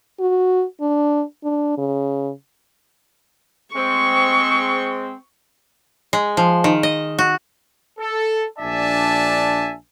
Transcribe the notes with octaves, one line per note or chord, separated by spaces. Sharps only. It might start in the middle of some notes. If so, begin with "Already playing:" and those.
F#4
D4
D4
C#3
G#3 C4 C#6
G#3
F3
D#3
D#5
F#4
A4
A#1 D4 D5 E5 G#5 A5